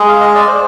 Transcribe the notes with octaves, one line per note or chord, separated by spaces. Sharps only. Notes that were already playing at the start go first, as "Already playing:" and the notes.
Already playing: G#3 G#4
F5
D#5
D5
C5